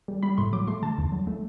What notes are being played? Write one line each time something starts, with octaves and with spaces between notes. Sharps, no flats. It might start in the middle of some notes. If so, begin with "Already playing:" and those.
G3
G3 B5
A2 C6
F#3 D6
A3 C6
D3 A5
E2
F#3
A3